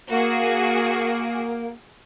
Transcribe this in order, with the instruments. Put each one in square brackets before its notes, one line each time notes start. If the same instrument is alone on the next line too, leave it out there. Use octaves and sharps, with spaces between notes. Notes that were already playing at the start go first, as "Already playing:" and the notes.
[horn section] A#3 [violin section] F#4 G#4